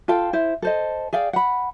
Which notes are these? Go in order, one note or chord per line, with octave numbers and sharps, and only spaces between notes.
F4 A4 F5 G5
E4 C5
A4 C5 D#5
G#4 D5 F5 G5
F#5 B5